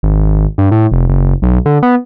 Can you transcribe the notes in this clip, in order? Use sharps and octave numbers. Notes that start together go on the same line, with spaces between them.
G#1
G2
A2
F1
F#1
B1
D3
B3